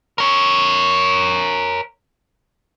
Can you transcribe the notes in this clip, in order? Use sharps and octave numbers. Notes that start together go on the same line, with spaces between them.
A#4 C#5